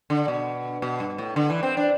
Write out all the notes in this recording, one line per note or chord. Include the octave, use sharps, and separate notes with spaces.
D3
B2
B2
G2
A2
D3
E3
C4
D4